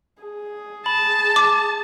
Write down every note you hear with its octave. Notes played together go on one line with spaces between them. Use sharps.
G#4
A5 B5
D6